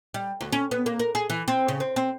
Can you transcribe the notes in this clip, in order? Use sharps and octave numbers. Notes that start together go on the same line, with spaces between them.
G3
D2
C#4
B3
A#3
A#4
G#4
E3
C4
C#3
C4
C4